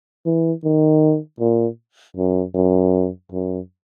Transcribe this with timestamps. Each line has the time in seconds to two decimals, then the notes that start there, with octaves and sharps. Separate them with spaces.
0.25 E3
0.64 D#3
1.40 A#2
2.17 F#2
2.55 F#2
3.32 F#2